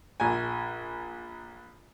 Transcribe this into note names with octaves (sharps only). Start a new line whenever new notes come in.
A#1 G#5